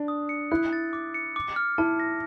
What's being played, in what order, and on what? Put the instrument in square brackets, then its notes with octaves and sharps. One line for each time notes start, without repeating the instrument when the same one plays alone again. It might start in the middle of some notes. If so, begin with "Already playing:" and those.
Already playing: [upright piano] D4
[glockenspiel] D#6
C#7
[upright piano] E4 [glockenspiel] F#6
[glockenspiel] A6
D6
C#7
D6
F6
[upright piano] E4 [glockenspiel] A5
[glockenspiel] A#6